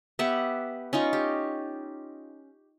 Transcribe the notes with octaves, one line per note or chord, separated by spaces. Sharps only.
B3 G4 E5 F#5
C#4 D#4 F4 C#6
G4